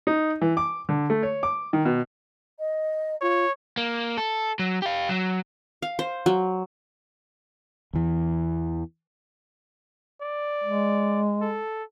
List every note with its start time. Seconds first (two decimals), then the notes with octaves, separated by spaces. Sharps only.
0.07 D#4
0.41 E3
0.57 D6
0.89 D3
1.10 A3
1.23 C#5
1.43 D6
1.73 D#3
1.85 B2
2.59 D#5
3.21 F4 C#5
3.77 A#3
4.18 A4
4.59 F#3
4.82 G4 F5
5.09 F#3
5.82 F5
5.99 C5
6.26 F#3
7.93 E2 E3
10.21 D5
10.64 G#3
11.41 A4